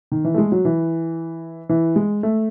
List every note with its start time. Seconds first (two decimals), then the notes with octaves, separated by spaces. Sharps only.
0.12 D#3
0.25 E3
0.34 A3
0.38 G#3
0.52 F#3
0.65 E3
1.69 E3
1.96 G#3
2.23 A3